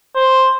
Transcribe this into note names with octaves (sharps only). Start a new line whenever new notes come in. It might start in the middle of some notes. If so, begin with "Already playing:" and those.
C5